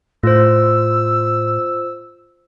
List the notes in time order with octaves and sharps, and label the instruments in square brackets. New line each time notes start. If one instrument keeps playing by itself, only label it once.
[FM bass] A2 [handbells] F4 C5 [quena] E6